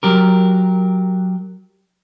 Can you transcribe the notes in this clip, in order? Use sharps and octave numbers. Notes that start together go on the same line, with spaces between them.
F#3 G4 A#4